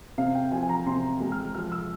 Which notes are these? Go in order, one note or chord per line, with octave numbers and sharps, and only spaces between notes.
C3 F5
G5
F3 G#5
G#5
A#5
C3 C6
G#3
F6
F3 F6
E6